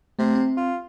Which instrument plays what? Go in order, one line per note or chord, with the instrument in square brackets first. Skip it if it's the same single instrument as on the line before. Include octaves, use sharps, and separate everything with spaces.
[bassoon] C3 [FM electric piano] A3 C4
[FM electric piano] C4
[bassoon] F4